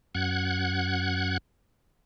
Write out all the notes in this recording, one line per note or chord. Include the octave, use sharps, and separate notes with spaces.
F#2 F#5 F#6 G#6